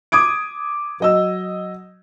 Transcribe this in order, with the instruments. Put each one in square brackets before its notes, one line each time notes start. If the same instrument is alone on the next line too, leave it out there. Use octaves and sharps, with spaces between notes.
[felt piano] D6 D#6 G#6 D7
F#3 D#5 E6